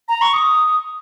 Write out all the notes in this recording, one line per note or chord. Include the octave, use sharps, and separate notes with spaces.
A#5
C#6
D#6